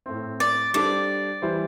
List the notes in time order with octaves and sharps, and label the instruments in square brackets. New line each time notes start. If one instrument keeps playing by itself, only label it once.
[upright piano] A2 A3 C4
[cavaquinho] D5
[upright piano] G3 D4 A4 C5 [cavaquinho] D5
[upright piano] E3 G3 E4 C5